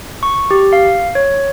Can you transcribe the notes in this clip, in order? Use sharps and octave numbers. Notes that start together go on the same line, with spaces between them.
C#6
G4
F5
C#5